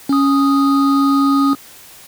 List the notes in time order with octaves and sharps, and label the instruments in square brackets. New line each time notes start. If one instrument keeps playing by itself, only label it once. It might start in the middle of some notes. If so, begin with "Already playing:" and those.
[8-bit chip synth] C#4 D#6